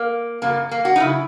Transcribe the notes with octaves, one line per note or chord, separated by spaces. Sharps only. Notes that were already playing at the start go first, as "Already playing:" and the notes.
Already playing: A#3
F#2 C#3 F#3 A#3
A#3
F#4
D#4
C#3 F#3 E4